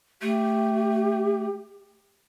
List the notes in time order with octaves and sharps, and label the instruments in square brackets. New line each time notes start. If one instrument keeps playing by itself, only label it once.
[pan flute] A3 [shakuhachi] G4